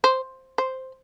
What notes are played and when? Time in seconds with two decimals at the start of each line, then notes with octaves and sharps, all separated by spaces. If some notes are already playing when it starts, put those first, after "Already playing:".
0.04 C5
0.58 C5